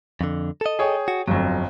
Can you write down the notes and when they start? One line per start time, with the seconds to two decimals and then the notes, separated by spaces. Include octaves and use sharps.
0.21 F2 D3
0.61 A4 D#5
0.79 G#4 C#5 G5
1.08 F#4
1.28 G1 F2 F#3